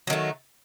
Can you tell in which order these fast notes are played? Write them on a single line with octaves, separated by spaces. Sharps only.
F#3 D#3 A3